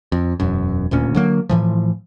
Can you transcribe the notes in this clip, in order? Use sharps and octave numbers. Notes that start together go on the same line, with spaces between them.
F2
E1 F#2
D#1 D2 A#2 C#4
D3 F#3 A#3
A2 E3 F3